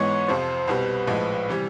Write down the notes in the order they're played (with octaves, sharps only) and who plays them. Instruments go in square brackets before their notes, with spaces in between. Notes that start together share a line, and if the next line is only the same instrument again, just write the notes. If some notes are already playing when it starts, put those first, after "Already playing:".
Already playing: [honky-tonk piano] G#2 E3 G#3 B3 [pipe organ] C#5
[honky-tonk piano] F2 C3 F3 [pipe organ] C5
[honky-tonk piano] C2 B2 G3 C4 [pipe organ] B4
[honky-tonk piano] A#1 A2 F3 G#3
C3 E3 G3